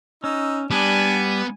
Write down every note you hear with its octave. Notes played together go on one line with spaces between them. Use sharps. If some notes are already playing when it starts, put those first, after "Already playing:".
C#4 D#4 E6
G3 B3 D4 G#5